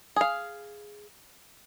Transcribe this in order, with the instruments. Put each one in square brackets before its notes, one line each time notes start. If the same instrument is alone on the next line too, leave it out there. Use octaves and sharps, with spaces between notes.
[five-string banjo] G#4 F5